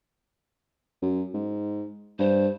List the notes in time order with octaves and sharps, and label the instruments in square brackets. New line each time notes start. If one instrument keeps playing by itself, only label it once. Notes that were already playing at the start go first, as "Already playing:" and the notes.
[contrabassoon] F#2
G#2
[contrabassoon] G2 [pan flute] C5